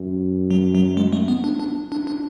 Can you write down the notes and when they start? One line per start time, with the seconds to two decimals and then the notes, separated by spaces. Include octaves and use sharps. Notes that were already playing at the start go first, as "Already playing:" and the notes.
Already playing: F#2
0.51 F#3
0.75 F#3
0.97 G#3
1.13 A3
1.28 B3
1.44 D4
1.59 D4
1.92 D4
2.07 D4